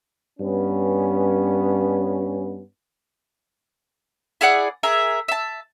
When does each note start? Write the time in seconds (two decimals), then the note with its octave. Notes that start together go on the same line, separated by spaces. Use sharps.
0.40 G2 B3 C#4
4.41 E4 G#4 D5 F#5
4.83 G#4 A#4 E5
5.28 E5 A5